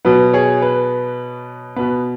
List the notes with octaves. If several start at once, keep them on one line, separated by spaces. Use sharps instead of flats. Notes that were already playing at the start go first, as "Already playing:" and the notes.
B2 F#3 B3 B4
G#4 C#5
B4
B2 B3 B4